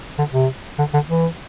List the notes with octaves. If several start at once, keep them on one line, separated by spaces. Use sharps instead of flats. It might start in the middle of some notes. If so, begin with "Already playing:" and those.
D3
C3
D3
D3
E3